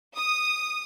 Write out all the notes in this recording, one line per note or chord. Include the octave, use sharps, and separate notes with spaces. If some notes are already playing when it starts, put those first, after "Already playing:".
D#6